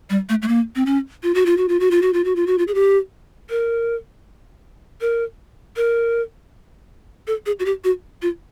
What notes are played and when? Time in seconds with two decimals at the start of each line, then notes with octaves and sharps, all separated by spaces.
0.10 G3
0.29 A3
0.42 A3
0.48 A#3
0.76 C4
0.86 C#4
1.23 F4
1.35 F#4
1.46 F4
1.57 F#4
1.68 F4
1.80 F#4
1.91 F4
2.02 F#4
2.13 F4
2.24 F#4
2.36 F4
2.47 F#4
2.58 F4
2.68 G#4
2.74 G4
3.50 A#4
5.01 A#4
5.77 A#4
7.27 A4
7.46 G#4
7.59 F#4
7.65 G4
7.84 F#4
8.22 F4